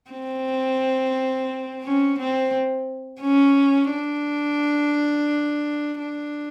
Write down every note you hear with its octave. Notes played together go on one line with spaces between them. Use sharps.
C4
C#4
C4
C#4
D4
D4